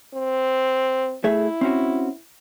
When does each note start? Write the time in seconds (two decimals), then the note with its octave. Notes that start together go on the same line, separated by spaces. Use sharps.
0.14 C4
1.24 A3 E4 G#4 E5
1.61 C4 C#4 F#4